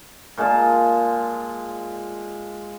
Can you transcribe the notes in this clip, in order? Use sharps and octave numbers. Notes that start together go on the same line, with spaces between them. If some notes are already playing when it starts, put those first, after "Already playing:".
A#2 G#3 F4 A5